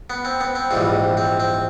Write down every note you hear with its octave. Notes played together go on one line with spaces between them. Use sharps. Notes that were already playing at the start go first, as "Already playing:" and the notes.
B3
C4
B3
C4
A#1 G#2 E3 G3 C4
C4
C4